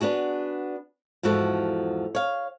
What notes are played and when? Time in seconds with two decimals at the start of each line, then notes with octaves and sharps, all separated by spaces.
0.01 B3 D4 F#4 G#4
1.23 E2 G#2 F3 F#4 A4
2.15 C#5 F5